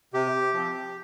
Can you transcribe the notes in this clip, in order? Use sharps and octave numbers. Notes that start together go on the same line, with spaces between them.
C3 G4
F3 C4